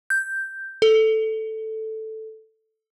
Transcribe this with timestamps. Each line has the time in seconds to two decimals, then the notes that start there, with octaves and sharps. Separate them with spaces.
0.10 G6
0.82 A4